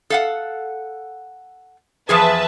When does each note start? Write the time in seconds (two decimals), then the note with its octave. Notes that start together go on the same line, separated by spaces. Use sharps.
0.10 A4 F5 F#5
2.09 E2 F3 G#4 B4 E5 A5